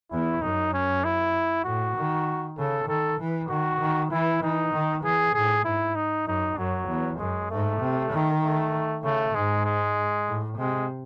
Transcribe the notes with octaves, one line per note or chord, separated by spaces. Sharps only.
E2 E4
F#2 D#4
C#4
E4
A2 F#4
D#3
C#3 A4
D#3 A4
E3
D#3 F#4
D#3
E3 E4
E3 D#4
D#3
E3 G#4
A2 G#4
G#2 E4
D#4
F#2 D#4
F#2 F#3
E2
F#2 G#3
G#2 A3
C3
D#3
A3
C#3 A3
G#2 G#3
G#3
A2
C3 G#3